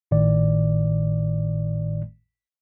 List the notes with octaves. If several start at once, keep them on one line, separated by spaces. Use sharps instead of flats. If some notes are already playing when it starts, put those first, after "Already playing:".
G#1 A2 D#3 D5